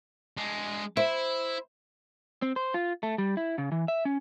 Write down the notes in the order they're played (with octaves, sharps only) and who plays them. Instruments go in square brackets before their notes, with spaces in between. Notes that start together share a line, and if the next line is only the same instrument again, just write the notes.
[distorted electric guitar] G#3 D4
[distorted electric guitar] E4 [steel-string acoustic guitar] C5 [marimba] E5
[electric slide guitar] C4
C5
F4
A3
G3
E4
C#3
E3
E5
C#4